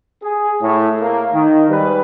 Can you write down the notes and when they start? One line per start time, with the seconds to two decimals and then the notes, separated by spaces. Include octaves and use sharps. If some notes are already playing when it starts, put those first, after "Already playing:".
0.22 G#4
0.62 A2
1.01 A#3
1.34 D#3
1.69 G#2 G3 B4